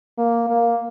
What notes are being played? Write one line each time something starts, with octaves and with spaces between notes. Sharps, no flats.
A#3
A#3